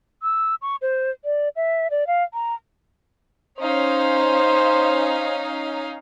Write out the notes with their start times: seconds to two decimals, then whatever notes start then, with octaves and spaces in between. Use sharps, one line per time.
0.22 E6
0.62 C#6
0.82 C5
1.25 D5
1.56 E5
1.91 D5
2.07 F5
2.34 A#5
3.59 C#4 D#4 C5 F5